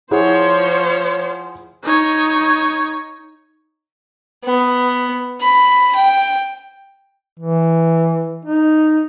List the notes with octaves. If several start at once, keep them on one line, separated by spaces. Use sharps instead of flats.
F3 E4 G#4 C5 C#5 F#5
D#4 C#5
B3
B5
G5
E3
D#4